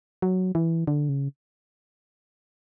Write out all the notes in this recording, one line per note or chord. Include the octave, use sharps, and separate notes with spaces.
F#3
E3
D3
C#3